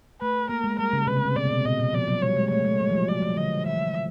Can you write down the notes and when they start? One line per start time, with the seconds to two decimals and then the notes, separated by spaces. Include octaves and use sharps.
0.21 A3 B4
0.49 A#3 A#4
0.64 G#3
0.79 G3 A#4
0.93 C#3
1.07 C3 B4
1.17 C#3
1.25 C3
1.36 B2 D5
1.47 C3
1.50 B2
1.65 A#2 D#5
1.80 B2
1.93 F3 D5
2.08 F#3
2.22 G3 C#5
2.36 G#3
2.50 A3 C#5
2.65 G#3
2.80 G3
2.90 F3
2.94 F#3
3.08 F3 D5
3.22 F3
3.37 D3 D#5
3.66 E3 E5